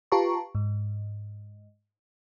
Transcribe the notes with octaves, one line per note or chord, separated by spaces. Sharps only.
F4 G4 B4 A5 A#5 C#6
G#2